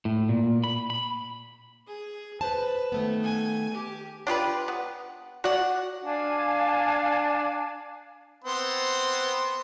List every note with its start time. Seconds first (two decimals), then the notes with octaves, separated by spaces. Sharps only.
0.05 A2
0.29 A#2
0.64 B5
0.90 B5
1.87 G#4
2.41 B4 C5 A5
2.92 D#3 A3 B3
3.23 G#5
3.74 G4
4.27 D4 F4 G4 B4
4.68 B3
5.44 F#4 D5 F#5
6.05 D4 F5 G#5 A5
8.44 B3 C4 C6